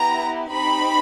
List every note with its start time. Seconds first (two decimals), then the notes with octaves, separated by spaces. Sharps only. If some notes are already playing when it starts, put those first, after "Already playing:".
Already playing: B3 E4 G4 A#5
0.51 C4 D#4 G4 B5